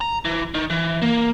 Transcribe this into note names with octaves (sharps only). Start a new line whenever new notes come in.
A#5
E3
D#3
E3
A#3